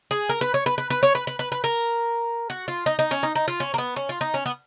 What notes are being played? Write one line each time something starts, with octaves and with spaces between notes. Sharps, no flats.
G#4
A#4
B4
C#5
B4
B4
B4
C#5
B4
B4
B4
B4
A#4
F#4
F4
D#4
D#4
C#4
D#4
D#4
F4
C#4
A#3
B3
C#4
F4
D#4
C#4
B3